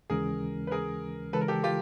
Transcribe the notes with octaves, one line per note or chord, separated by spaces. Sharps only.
D#2 C#3 E3 G#3 C#4 G#4 A#4
B4
G#4 A#4
C#3 E3 G#3 A4 B4
A#4
G4 A4
F4 G4